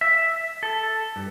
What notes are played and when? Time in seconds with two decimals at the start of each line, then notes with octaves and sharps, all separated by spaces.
0.01 E5
0.63 A4
1.16 G2